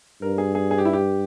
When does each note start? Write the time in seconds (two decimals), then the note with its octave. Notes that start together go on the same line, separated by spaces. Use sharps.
0.22 G2 A#4
0.38 G#4
0.55 G#4
0.71 G#4
0.78 G4
0.85 E4
0.93 G4